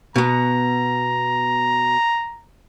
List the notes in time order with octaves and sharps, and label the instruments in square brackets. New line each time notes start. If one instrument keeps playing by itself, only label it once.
[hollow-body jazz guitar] B2 B3 [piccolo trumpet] A#5